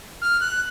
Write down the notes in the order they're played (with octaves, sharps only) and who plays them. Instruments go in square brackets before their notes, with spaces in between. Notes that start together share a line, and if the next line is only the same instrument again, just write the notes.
[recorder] F6
F#6